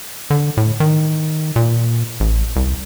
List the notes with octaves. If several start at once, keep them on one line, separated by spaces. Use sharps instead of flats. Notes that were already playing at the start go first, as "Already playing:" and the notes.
D3
A2
D#3
A#2
A1
C2